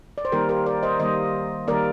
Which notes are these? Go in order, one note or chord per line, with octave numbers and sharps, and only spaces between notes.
D5
C5
D#3 G3 A#3 G4 A#4
G4 A#4
A#4 D5
C5 D#5
D#3 G3 A#3 C5 D#5
D#3 G3 A#3 A#4 D5